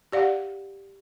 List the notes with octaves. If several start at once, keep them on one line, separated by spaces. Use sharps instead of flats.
G4 D5 F5 F#5